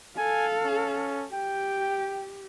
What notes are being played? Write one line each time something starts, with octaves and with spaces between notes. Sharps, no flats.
A4 F5 G#5
C#4
G4 G5